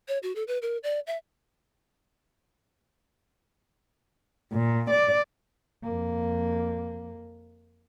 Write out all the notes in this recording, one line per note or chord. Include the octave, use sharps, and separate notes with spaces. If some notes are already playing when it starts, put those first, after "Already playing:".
C#5
F#4
A4
B4
A#4
D5
E5
A#2
D5
F2 A#3